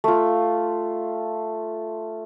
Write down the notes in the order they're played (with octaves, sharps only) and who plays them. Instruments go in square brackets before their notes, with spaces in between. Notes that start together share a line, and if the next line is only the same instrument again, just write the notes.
[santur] A3 F4